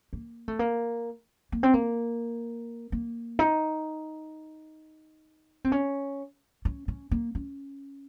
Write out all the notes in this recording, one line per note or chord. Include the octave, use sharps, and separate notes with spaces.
A#3
A3
A#3
A#3
C4
A#3
A#3
D#4
C4
C#4
C#4
C#4
A#3
C#4